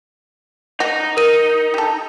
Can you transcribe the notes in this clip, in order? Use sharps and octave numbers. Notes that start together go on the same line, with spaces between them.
D#4 F#4
A#4 D#7
G4 A4